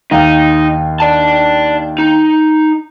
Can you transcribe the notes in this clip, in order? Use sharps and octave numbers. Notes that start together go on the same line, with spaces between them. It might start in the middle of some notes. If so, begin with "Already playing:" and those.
D#2 D#4 F5 G5
D5 A5
D#4